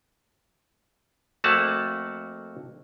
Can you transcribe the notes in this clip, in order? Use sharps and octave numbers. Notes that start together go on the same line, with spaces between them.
F2 A3 A#3 F#4 F#5 A5